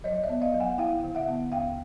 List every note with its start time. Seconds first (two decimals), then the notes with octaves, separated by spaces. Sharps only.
0.04 F#3 C#5 D#5
0.24 D5 E5
0.29 B3
0.42 D#5 F5
0.54 F#3
0.60 F#5 G#5
0.78 E4 F5 G5
1.04 D3
1.15 E5 F#5
1.28 B3
1.52 D#2 F5 G5